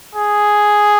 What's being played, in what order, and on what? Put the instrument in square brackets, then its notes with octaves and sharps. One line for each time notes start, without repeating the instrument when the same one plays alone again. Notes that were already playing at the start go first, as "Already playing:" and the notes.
[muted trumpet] G#4